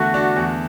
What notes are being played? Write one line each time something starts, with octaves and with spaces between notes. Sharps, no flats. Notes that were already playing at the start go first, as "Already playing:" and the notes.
Already playing: E2 D3 A3 F#4
D4
E2